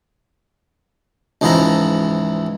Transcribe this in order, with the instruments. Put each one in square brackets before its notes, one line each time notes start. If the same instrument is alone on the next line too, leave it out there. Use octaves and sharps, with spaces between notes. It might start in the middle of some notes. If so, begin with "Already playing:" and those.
[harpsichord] C#2 G#2 E3 F3 E4 A#5